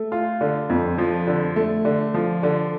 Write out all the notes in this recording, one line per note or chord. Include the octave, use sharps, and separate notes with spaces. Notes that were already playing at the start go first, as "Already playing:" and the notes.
Already playing: A3
F4
D3
F2
F3
D3
A3
D3
F3
D3